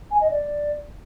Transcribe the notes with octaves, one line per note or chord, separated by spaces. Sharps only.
G#5
D#5
D5